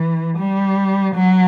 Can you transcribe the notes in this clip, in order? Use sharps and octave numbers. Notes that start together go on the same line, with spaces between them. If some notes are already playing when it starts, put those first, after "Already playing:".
Already playing: E3
G3
F#3